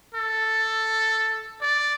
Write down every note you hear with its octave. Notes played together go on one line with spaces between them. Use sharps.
A4
D5